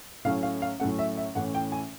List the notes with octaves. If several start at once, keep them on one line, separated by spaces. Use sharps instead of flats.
A2 F#3 A3 C#4 F5
F5
F5
A2 F#3 A3 C#4 F#5
E5
E5
A2 E3 A3 C#4 F#5
G5
G#5